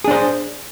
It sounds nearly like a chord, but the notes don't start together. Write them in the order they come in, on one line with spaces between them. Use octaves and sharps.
G#4 D4 C5